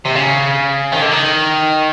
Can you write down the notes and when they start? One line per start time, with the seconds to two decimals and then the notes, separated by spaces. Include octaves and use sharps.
0.05 C3
0.15 C#3
0.93 D#3
1.02 D3
1.11 D#3